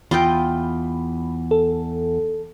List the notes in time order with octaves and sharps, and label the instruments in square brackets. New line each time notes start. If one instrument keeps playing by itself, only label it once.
[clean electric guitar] E2 [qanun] F4 D#5 G5 [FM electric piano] B5
[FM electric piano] A4